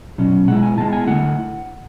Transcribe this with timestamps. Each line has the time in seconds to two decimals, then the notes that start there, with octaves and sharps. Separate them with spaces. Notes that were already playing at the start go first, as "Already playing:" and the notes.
0.18 B2 F#3 C#4
0.48 B2 G#3 E4 F#5
0.63 G#5
0.77 B2 G#3 B3 E4 A5
0.93 G#5
1.07 D3 A3 C#4 E4 F#5